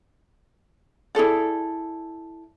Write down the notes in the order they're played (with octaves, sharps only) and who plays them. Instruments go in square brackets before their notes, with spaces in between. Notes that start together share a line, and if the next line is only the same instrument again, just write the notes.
[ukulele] E4 G#4 A4 D5